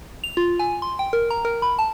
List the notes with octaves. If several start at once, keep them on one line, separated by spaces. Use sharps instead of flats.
F7
F4
G#5
C6
G5
A#4
A#5
A#4
B5
A5